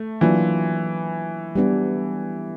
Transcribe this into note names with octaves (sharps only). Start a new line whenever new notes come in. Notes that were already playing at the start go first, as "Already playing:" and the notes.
Already playing: A3
E3 F#3 A#3 D4 F4
G3 B3 D4